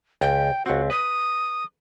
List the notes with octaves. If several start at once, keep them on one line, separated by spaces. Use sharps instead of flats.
C#2 G5
C#2 C4 F#4
B4 D#6